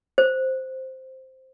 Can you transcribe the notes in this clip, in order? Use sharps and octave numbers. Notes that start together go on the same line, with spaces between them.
C5